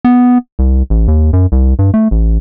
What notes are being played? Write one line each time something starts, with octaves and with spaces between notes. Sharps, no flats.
B3
C2
A1
D#2
F#2
C2
G2
A3
A1